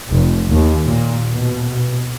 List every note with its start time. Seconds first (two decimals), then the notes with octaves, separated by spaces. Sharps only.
0.11 F1
0.50 D#2
0.86 A#2
1.35 B2